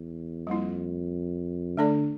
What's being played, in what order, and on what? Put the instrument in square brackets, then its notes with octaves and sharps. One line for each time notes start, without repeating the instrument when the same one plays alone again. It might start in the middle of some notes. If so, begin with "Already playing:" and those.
Already playing: [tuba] E2
[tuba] F2 [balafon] G3 A#3 E4
[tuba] D3 [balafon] A3 D4 A4 D5